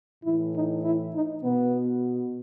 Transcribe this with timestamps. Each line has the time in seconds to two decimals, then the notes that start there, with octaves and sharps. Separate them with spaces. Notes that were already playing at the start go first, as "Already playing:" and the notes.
0.23 A2 E3 E4
0.53 D#4
0.83 E4
1.13 D#4
1.43 B2 B3